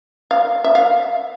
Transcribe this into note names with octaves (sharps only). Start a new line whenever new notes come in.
F5
E5
F5